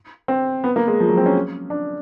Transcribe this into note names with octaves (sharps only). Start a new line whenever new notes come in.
C4
B3
A#3
G#3
F3
F#3
C4
C#4
D4